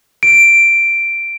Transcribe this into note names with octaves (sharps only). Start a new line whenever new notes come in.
D7